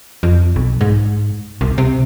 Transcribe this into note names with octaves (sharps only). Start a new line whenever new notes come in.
F2
B1
G#2
C2
C3